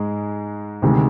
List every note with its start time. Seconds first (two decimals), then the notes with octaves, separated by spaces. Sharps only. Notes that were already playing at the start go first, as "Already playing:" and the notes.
Already playing: G#2 G#3
0.82 D2 C3 D#3 G#3